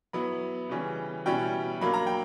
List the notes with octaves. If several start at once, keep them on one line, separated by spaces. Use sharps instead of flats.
F#3 B3 E4 B5
C#3 E3 G3 C#4
B2 G3 C#4 E4 G5
F#3 A#3 D4 B5
A#5
G5